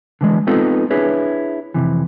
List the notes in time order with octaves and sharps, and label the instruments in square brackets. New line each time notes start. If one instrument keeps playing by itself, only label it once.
[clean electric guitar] D3 E3 G#3
G#3 B3 C4 D#4 F4 A4
D4 E4 G#4 B4 C#5
F2 C3 E3